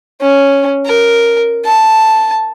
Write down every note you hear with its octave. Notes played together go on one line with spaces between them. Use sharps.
C#4
A#4
A5